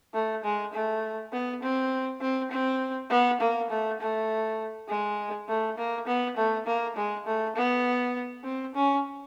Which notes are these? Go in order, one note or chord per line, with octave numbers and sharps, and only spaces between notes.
A3
G#3
A3
B3
C4
C4
C4
B3
A#3
A3
A3
G#3
A3
A#3
B3
A3
A#3
G#3
A3
B3
C4
C#4